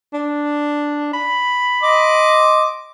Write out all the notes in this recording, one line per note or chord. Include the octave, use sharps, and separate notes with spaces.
D4
B5
D#5 C6 D6